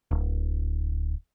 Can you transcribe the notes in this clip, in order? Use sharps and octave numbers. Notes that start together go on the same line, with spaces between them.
D1